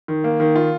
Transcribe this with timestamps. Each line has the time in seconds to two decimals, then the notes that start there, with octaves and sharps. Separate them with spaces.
0.08 D#3
0.24 A#3
0.40 D#3
0.56 F4